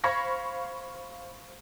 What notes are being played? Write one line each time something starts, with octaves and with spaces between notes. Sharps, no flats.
C5 F5 B5 C#6 G#6 A#6